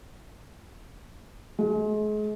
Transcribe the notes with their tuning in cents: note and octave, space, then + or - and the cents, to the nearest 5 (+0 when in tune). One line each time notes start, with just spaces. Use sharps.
G#3 +35